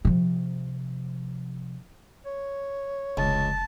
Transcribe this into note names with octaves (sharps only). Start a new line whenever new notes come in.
C3 F3
C#5
F1 C#2 A5